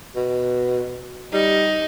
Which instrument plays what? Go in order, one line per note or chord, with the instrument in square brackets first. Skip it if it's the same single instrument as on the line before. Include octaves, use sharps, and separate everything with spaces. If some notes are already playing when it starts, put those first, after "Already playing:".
[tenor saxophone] B2
[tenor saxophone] G3 [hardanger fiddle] D#4